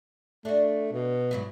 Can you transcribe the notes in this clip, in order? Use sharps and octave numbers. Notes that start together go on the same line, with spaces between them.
A3 D4 F#4
B2
G#2 F#3 E4